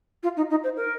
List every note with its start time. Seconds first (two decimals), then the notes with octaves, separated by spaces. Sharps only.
0.23 F4
0.37 D#4
0.50 D#4
0.64 C5
0.77 A#4